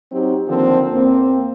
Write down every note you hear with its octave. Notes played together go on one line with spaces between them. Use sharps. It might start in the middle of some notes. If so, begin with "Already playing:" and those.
F#3 C4 D#4 G4
D3 D#3 F3 A#3 C4
E2 A#3 C4